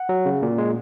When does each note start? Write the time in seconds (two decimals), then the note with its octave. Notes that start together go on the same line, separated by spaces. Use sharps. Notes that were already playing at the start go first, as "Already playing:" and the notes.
Already playing: F#5
0.09 F#3
0.25 C#3
0.42 A#2
0.58 G#3